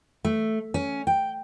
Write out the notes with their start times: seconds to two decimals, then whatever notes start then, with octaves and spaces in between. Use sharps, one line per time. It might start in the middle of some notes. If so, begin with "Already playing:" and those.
0.25 A3
0.74 C#4
1.07 G5